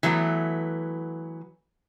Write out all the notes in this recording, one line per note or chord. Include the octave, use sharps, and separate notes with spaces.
E3 F#3 A3 B3